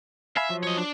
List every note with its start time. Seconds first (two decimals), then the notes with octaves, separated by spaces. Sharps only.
0.37 E5 F5 G#5 B5
0.49 F3 F#3
0.63 C#5 D#5
0.77 D4